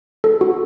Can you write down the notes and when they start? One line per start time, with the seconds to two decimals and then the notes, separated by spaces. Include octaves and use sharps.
0.24 A4
0.41 F#4